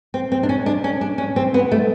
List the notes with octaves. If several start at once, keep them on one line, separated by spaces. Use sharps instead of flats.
C4
C4
D4
C#4
D4
C#4
D4
C#4
C4
B3
A3